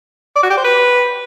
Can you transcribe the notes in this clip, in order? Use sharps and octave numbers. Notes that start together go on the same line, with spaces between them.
D5
F#4
G4
C5
B4